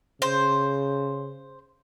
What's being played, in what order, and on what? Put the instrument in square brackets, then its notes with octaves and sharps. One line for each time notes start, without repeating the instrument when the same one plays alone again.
[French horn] C#3 [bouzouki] C5